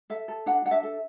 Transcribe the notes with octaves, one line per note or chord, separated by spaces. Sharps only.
A4 E5
A4
D4 F#5
D4 F#5
E5
A4